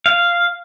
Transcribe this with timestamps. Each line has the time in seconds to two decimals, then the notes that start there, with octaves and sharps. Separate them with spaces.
0.06 F5